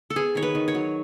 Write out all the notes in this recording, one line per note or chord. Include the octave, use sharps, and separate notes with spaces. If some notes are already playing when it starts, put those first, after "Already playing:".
A4
B3 G#4
D#3 C#5
B4
D#3
C#5
F#3